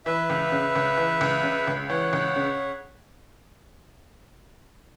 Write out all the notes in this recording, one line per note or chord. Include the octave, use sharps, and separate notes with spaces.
E3 B4 E5
C#2
C#3
C#2
E3
C#2
C#3
C#2
E3 C#5 F#5
C#2
C#3